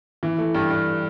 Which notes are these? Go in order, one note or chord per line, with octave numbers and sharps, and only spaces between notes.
E3
A3
G2
G2